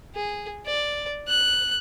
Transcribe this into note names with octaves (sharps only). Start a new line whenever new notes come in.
G#4
D5
F#6